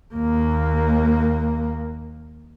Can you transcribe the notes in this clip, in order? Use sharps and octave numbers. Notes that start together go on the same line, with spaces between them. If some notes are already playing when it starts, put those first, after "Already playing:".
D#2 A#3